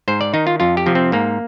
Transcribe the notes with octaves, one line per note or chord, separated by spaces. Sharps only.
G#2 C5
D5
D#3 D#4
F4
F2 F4
G4
C3 F3
C4
G#2 A#3